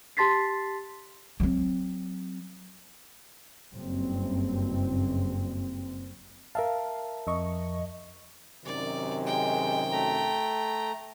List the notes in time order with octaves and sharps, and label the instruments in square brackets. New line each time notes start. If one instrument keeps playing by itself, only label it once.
[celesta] G4 A5 C6 A6 B6 C7
[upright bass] F#3 C4
[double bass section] F#1 G2 C4
[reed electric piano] A#4 E5 A5 [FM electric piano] F5
[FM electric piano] F2 D#5 C#6
[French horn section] F#2 C3 D#3 [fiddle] D5
[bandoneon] G#3 [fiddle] G5
[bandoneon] A3 A#5